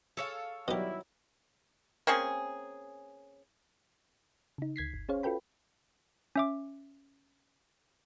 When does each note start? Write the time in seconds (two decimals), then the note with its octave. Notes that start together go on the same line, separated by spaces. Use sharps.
0.17 G#4 A4 C#5 F5
0.68 B2 D#3 F#3 G3 E4 G4 A#4
2.07 A#3 C4 C#4 G#4
4.58 C#3 D#4
4.76 D2 G#6 B6 C7
4.94 G1
5.09 C#4 G#4 C5 C#5 F5
5.23 F4 F#4 A4 B4 G5 B5
6.36 C#4 E5 D6